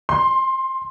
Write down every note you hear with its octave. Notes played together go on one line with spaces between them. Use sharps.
C6